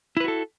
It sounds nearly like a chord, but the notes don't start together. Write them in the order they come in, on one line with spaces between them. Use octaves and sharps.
E4 B4 F#4 A4